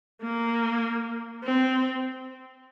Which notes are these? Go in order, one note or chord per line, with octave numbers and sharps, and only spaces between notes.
A#3
C4